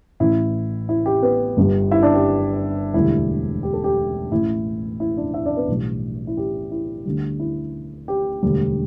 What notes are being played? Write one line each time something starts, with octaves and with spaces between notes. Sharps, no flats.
A1 A2 E3 E4
E4
G4
B3 B4
G1 G2 G3
E4 E5
D4 D5
G4
E1 D2 D3 G3 E4
G4
A4
G4
A1 A2 E3 E4
E4
D4 D5
E4 E5
D4 D5
B3 B4
B1 A2 E3 G3
E4
G4
E4
D2 D3 G3
E4
G4
E1 D2 D3 G3